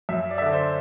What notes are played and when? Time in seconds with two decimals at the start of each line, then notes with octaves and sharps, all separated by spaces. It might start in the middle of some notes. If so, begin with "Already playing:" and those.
0.09 F#2 E5
0.31 D5
0.38 E5
0.41 D3 D5
0.53 C5